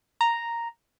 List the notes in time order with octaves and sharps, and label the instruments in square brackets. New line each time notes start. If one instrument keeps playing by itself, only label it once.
[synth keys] A#5